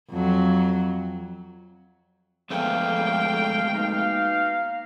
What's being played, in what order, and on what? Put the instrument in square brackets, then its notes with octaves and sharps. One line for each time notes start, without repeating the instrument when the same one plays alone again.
[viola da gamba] F2 F#3
[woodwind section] D3 F3 [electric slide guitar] G#3 A3 B3 [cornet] F5 [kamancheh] G5
[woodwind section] B2 A#3 D#4